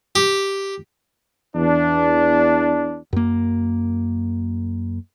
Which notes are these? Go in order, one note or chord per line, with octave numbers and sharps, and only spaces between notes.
G4
E2 D4
F#2 A#3